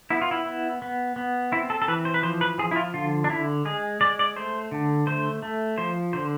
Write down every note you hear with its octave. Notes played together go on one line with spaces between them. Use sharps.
B3 E4
F4
E4
B3
B3
B3
C4 E4
A4
A4
E3 B4
C5
B4
F3 C5
B4
F3 G#4
E4
F4
D3 F4
D4
D3 E4
G#3 G#4
G#3 D5
D5
A3 C5
D3
A3 C5
A3
F3 C5
D3 C5